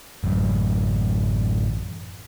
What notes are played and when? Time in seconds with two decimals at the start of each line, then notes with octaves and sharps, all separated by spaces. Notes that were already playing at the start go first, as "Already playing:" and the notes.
0.24 A1 F#2